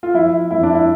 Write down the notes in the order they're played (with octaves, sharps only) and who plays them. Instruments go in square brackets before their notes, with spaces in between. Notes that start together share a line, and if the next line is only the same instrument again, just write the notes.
[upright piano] F4
F3 E4
F2 E4
D4
E4